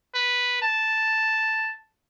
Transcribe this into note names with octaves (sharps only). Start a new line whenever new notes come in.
B4
A5